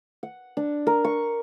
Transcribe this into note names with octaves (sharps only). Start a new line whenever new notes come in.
F#5
D4
A#4
C#6